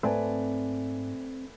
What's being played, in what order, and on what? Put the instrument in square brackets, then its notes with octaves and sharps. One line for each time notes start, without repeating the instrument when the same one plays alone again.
[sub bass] G#2 [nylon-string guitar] A3 [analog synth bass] C4 [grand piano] B4 D5 G#5